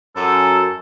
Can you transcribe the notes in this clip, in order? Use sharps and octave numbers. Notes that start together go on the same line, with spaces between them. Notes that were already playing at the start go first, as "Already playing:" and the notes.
F#2 A4